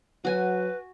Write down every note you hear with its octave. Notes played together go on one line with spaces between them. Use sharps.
F#3 F#4 B4 G#5